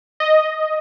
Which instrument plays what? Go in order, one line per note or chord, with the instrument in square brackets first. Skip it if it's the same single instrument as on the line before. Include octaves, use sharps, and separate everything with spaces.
[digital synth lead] D#5